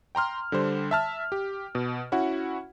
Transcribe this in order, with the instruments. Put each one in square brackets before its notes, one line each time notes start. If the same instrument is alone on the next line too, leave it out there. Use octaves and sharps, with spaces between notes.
[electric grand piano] G5 A#5 C6 F6
D3 G3 C5
E5 A5 F6
G4
B2
C#4 E4 F#4 F#5